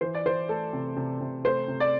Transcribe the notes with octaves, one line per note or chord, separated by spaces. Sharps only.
E3 C5
D5
E3 C5
A3 A4
C3
C3
C3
A3 C5
C3
D5